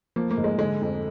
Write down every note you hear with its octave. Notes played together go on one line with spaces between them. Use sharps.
F3 A#3
A#3
G#2
G#3
D3 G#3
F2